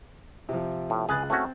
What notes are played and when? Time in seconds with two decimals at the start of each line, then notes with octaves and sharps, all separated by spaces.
0.49 C3 F3
0.90 A2
1.09 C#2 G#4 B4 F#6 A6
1.30 A3 C4 C#4 F#4